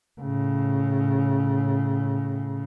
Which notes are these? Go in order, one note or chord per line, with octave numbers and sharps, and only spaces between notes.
A2 C#3